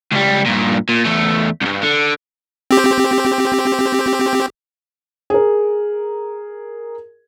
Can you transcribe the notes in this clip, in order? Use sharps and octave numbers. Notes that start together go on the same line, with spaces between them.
C#2 G3
G2 A#2
A#2
E2 A3
C2 G2
D3
C4 G4
G#4 A#4